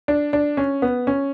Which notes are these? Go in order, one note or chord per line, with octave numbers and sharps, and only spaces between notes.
D4
D4
C#4
B3
C#4